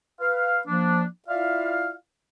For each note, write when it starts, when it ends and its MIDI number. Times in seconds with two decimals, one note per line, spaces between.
0.21 0.59 71
0.21 0.59 77
0.67 1.04 53
0.67 1.04 58
0.67 1.04 62
1.28 1.92 64
1.28 1.92 65
1.28 1.92 74
1.28 1.92 76
1.28 1.92 77